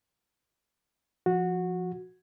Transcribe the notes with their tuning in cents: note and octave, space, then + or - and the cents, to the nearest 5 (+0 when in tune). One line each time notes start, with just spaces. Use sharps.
F3 +0 F#4 -15